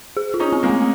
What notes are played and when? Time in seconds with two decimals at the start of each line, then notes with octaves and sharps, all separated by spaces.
0.17 G#4
0.34 F4
0.40 C#4 D#4
0.52 C4
0.63 G#3 A#3
0.70 A3